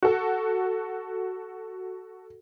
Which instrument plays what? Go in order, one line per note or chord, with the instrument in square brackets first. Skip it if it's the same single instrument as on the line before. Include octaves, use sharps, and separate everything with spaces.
[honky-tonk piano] F#4 A4